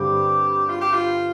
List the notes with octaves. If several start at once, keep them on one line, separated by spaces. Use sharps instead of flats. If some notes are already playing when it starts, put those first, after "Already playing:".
Already playing: G2 D3 G3 C4 G4
F4
G4
F4